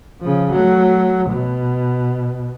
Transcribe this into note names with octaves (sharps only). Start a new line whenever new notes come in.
C#3 F3
F#3 A3
B2